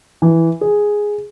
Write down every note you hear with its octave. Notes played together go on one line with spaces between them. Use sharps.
E3
G#4